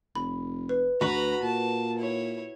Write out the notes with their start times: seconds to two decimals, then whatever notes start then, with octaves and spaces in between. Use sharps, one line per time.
0.15 F1 B5
0.69 B4
1.01 D2 F#4 B4 A#5 B5 C#6
1.42 A#2 A5
1.98 E4 C#5